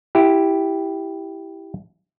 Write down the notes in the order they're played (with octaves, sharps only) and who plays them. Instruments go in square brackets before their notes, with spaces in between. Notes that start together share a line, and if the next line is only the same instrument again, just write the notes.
[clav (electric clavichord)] E4 G4